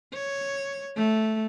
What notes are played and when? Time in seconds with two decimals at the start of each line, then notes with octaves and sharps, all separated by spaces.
0.13 C#5
0.96 A3